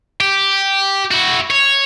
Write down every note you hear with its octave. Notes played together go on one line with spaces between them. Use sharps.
G4
E4 F#4
C#5